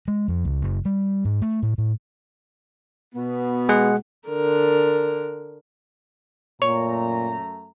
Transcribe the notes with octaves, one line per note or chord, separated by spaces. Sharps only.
G#3
F2
C#2
F#1
G3
G#2
A3
A2
A2
B2 B3
G#3 G#4 F#5
D3 A#4
F#2 A#2 A3 C#5 A#5